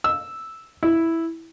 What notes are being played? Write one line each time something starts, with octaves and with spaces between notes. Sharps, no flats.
E6
E4